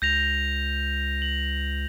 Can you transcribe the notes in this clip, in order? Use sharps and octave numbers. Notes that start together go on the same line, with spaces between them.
C#2 G6 A#6 F7
F#7